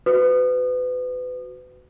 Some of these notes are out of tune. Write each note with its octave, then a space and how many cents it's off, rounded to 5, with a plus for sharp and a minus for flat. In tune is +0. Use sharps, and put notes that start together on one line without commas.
F#4 +0 B4 +30 D#6 -35